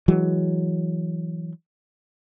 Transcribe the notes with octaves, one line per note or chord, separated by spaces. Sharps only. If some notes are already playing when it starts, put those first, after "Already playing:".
E3 F#3 G#3